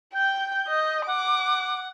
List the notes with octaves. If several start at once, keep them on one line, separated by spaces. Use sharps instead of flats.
G5 G6
D#5
F#5 D6